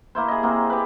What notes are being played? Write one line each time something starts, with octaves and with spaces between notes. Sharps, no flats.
A#3 E4 C5
G#4 D#5
A#3 C4
G4 B4